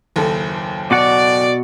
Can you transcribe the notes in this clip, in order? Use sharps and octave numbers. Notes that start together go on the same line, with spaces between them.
F#1 D#2 A4
B2 F#4 D5 F#5